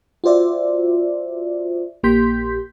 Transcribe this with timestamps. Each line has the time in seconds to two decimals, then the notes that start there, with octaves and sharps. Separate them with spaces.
0.24 F4 F#4 C5 D5 E5
2.03 A#1 A#3 G4 C6 G6 B6